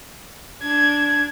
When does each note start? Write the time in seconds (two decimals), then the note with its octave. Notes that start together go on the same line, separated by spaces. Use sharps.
0.62 D4 G#6